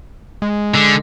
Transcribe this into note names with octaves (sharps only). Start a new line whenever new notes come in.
G#3
D3